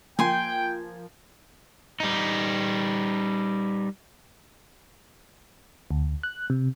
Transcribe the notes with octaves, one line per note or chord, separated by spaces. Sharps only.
F3 A#3 G5 G#5 C6
G3 D#4
D2
F#6
C3